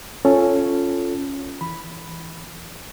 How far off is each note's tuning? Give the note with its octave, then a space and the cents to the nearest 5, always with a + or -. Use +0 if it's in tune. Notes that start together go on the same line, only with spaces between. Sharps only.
C#4 +0 F4 +0 A4 +0
E3 +0 B5 +0